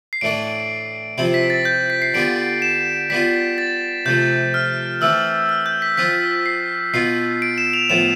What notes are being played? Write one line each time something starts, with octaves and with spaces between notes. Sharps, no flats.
C7
A2 E3 A3 D4 D7
C3 F3 C4 E4 D7
B6
A6
G6
B6
C7
D3 G3 B3 F4 D7
E7
G3 B3 F4 B6
A6
C3 F3 A3 G6
F6
E3 A3 C4 E6
F6
G6
B6
F3 C4 F4 B6
C7
B2 B3 F4 C7
D7
E7
F7
A2 F3 B3 E7